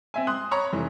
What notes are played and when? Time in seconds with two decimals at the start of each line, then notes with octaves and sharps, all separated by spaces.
0.14 C4 E5 G#5
0.27 C6 D#6 F#6
0.51 C#5 A#5 B5 C#6
0.73 F1 E3